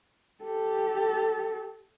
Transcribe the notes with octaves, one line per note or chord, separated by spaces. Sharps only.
G4 A4